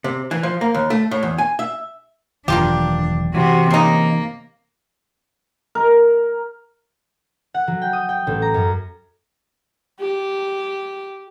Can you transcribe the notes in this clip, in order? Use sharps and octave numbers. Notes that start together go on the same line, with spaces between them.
C3
E3
F3
A#3
D#2
A3
A2
E2
G#5
E5
E1 D#3 F#3 A#3 D4 F4 G4
C3 E3 F#4
C#3 A#3 D#4
A#4
F#5
F#3
G5
D#6
G5
A1
A#5
F#2
G4